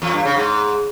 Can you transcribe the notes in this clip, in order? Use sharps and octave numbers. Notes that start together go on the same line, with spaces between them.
E2
G2
C#3
G#2